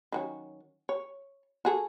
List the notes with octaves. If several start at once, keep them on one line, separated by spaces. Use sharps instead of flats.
D#3 F#3 C#4
C#5
F#4 G#4 A4